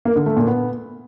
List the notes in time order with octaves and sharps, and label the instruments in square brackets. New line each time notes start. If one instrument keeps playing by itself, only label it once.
[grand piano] A#3
D3
A3
A#2
B3